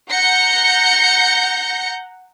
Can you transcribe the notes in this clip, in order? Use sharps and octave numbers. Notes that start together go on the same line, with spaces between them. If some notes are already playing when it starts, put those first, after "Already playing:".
F#5 A#5 G6 A#6 C#7